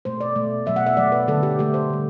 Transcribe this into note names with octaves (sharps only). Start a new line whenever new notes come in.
B2 A3 C5
D5
B2 A3
B2 F#3 A3 E5
F#5
E5
B2 F#3 A3 D5
B4
D3 F#3 A3 A4
G4
D3 F#3 A3 G4
C5
D3 G3